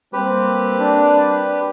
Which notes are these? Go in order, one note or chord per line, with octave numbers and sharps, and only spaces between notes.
G3 A#3 C4 G4 B4
D4